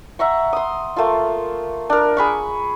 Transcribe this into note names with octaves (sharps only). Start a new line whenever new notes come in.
E5 F#5 A#5 C#6
C6 D#6
A3 A#3 F4
D4 A#4
G#4 B5 C#6